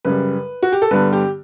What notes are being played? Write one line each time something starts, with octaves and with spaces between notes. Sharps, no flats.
F#2 C#3 G3 B4
F#4
G4
A4
G2 D3 G3 B3 B4
G4